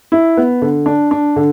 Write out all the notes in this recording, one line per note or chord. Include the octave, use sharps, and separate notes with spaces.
E4
B3
D3
D4
D4
D3